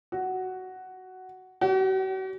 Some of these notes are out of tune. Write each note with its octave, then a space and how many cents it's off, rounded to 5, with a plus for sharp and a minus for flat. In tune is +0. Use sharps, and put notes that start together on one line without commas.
F#4 +10
F#4 +45